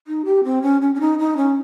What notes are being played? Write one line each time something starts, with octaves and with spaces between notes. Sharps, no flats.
D#4
G4
C4
C#4
C#4
C#4
D#4
D#4
C#4